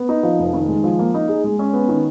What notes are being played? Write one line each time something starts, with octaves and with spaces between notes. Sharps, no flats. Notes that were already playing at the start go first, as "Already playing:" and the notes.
Already playing: B3
D#4
F3
F1
D#3
G#3
F3
A#3
D#4
G#4
G#3
C#4
B3
D#3